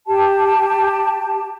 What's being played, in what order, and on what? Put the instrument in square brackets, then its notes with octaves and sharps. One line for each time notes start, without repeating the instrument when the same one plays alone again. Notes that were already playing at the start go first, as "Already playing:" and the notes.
[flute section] G4 A5